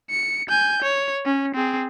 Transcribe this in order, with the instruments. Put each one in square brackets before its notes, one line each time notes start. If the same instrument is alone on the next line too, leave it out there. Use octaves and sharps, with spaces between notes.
[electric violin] C#7
G#5 G6
C#5
C#4
C4 G#4